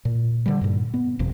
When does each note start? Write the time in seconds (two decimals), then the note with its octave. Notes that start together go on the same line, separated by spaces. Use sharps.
0.05 A#2
0.46 D3 G3
0.61 G2 A#2
0.94 B3
1.19 G1 F2 C3